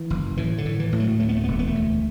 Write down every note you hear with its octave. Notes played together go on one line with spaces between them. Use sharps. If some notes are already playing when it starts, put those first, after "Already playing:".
Already playing: E3
F#1
A2 E3
D3
A2
E3
A2
F#3
D2 A3
B3
A3
B3
E1 A3
B3
A3
D2